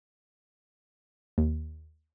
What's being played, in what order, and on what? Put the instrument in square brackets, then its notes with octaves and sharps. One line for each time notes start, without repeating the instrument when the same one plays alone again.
[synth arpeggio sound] D#2